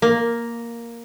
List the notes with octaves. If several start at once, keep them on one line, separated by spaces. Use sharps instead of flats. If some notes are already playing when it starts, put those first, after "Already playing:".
A#3